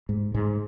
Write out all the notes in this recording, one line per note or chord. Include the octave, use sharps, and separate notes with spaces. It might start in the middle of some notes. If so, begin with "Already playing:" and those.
G#2
G#2 G#3